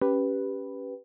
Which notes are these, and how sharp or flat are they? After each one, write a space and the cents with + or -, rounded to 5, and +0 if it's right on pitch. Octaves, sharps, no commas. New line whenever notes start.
C#4 +0 G4 +0 B4 +0